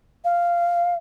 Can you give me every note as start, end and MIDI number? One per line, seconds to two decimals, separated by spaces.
0.24 0.94 77